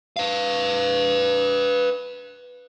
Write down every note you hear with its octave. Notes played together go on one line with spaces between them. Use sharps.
B4 F5